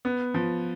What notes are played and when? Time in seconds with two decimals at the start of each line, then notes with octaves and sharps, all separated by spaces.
0.05 B3
0.34 F3